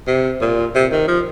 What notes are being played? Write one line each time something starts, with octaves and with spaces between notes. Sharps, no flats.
C3
A#2
C3
D#3
F3